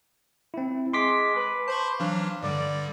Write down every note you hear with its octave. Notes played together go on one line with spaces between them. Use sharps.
C4 E4
G#3 C6 D6 B6
B4
C5 A5 B5 C#6
E3 F#3 D4 F5
G2 D3 G3 D5